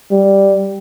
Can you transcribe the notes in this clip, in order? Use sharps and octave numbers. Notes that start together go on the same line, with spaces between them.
G3